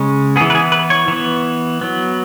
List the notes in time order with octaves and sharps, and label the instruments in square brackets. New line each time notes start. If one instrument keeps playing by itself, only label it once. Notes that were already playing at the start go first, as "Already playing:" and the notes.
Already playing: [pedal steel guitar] C#3 G#3 C#4
B3 G#4
E3
B4
G#4
B4
C#5
E3 B3
F#3 B3